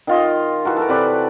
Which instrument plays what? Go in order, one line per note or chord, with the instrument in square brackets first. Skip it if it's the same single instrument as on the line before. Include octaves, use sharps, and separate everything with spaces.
[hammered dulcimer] D#3 F4 D#5
E3 F#4 A#4
A4 A#4
C3 B4 D5